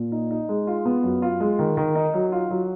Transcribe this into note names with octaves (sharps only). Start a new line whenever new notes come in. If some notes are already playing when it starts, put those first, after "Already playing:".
Already playing: A#2
D#4
D#4
G#3
F4
B3
F#2
F4
G#3
D#3
D#3
D#4
F#3
F4
F#3